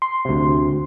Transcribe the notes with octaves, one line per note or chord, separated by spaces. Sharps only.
C6
D2 C3